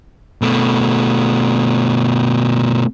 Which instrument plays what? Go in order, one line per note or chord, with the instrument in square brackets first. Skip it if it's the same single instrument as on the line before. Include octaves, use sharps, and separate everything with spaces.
[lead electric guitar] B2 A3